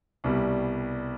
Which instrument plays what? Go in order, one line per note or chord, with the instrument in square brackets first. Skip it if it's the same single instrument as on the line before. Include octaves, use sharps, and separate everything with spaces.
[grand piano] C2 B2 G3